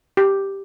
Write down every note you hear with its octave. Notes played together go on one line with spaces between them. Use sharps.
G4